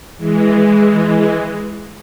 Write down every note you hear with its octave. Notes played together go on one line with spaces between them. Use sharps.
E3 G#3